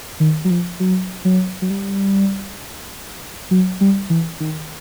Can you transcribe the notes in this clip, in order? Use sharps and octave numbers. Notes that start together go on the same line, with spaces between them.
D#3
F#3
F3
F#3
F#3
F#3
G3
F#3
G3
E3
D#3